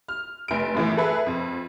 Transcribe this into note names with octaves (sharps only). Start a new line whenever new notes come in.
F6
F1 D7
F#2 A2 E3
G#4 A4 B4 E5
F2